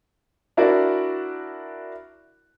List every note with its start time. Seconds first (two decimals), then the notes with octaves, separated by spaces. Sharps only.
0.57 D4 E4 F#4 A#4 D5